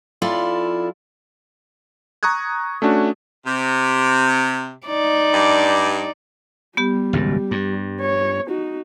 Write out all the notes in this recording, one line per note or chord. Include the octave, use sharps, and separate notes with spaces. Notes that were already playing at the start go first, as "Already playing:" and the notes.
F2 E4 F4 A4 D5
A#5 C#6 D#6 F#6 G#6
A3 C#4 D4 F#4
C3
D#4 D5
G2
G3 B3 G4
G#1 C#2 F#2
G2
C#5
D#4 F#4